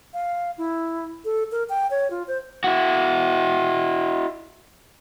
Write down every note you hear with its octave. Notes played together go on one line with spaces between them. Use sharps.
F5
E4
A4
A#4
G5
C#5
F4
C5
E4 F#4